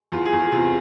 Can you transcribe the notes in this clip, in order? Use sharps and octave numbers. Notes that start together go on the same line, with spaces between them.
E2 F4
G#4
E2
F4
C3 F4